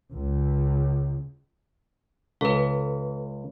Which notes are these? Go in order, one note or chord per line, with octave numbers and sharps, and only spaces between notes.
C#2
C#2 A4 B4